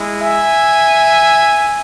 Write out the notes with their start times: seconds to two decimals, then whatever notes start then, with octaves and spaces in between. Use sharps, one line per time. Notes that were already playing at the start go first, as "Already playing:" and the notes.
Already playing: G#3 E4
0.20 E5 G#5